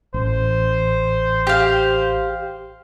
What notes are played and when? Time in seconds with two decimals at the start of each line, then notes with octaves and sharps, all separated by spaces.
0.14 A1 C5
1.47 G4 F5